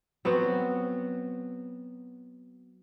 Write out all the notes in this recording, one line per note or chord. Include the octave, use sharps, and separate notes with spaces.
F#3 B3 C4 F#4